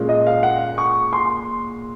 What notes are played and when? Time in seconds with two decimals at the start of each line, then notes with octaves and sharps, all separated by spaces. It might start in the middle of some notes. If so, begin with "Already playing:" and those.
Already playing: A#2 G#3 C#4 F4 G#4
0.09 D#5
0.27 F5
0.43 F#5
0.78 C#6
1.13 C6